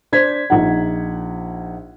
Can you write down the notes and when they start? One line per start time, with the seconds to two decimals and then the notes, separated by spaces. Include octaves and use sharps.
0.12 D4 C5 G#6 B6
0.50 A#1 D#4 F4 F#5